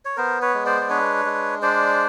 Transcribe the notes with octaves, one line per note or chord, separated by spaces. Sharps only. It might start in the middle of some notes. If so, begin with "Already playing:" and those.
C#5
B3 A#4 C5
B4 C#5
G#3
C5 D5
D5
D4 B4 C#5
G#3
D4 C5 D5